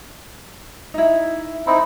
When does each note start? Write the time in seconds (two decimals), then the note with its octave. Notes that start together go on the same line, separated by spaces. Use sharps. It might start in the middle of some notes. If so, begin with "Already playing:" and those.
0.94 D#4 E4
1.67 C4 D#4 E4